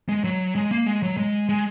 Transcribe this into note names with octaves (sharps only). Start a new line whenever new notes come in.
G#3
F#3
G#3
A#3
G#3
F#3
G#3
G#3